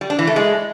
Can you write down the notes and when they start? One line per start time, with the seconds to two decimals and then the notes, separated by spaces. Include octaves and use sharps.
0.01 G3
0.10 D4
0.19 E3
0.27 A3
0.36 G#3